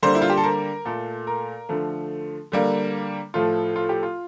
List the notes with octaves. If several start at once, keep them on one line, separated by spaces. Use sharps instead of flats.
D3 G3 A#3 C5
E4
F4
G4
A4
A#4
A#2 A3 A4
A#4
D3 F3 A3
D3 G3 A#3
A2 F3 A3 F4
F4
G4
F4